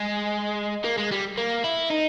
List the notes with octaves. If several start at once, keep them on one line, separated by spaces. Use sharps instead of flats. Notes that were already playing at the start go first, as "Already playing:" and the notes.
Already playing: G#3
A#3
G#3
G3
A#3
E4
D#4